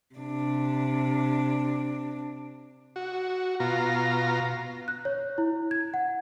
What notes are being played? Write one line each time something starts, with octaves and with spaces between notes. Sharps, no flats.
C3 D4
F#4
B2 F4 A#5
F#6
C#5
E4
G#6
F#5